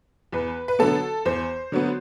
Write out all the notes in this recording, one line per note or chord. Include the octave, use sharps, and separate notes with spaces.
E2 B4
B4
D3 F#3 B3 A4
E2 C5
D3 F#3 B3